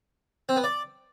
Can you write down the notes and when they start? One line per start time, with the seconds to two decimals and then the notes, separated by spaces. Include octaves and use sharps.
0.49 C4
0.56 B3
0.64 D5